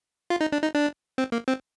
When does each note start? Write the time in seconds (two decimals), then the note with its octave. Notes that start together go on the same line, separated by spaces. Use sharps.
0.30 F4
0.41 D#4
0.52 D4
0.62 D#4
0.74 D4
1.18 C4
1.32 A#3
1.48 C4